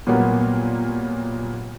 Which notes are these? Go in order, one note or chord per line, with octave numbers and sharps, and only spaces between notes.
A#2 F#3 G3 A#3 B3